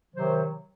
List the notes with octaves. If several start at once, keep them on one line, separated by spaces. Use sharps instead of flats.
C3 D#3 F#3 C5